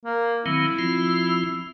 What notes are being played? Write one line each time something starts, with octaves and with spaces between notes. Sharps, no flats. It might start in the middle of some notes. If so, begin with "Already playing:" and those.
A#3
D#3 F#3 C4 E4
F3 C4 F4